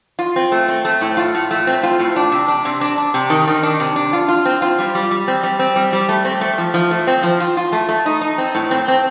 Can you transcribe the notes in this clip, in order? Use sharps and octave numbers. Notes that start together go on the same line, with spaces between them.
F4
C4
A3
C4
A3
A2
F4
A2
A3
C4
F4
A2
D4
C3
D4
C3
D4
D4
C3
D#3
D#3
D4
C3
D4
F4
F4
C4
F4
G3
G3
G3
C4
G3
C4
G3
G3
A3
C4
A3
F3
F3
A3
C4
F3
F4
F4
A3
A3
D#4
D#4
C4
A2
C4
C4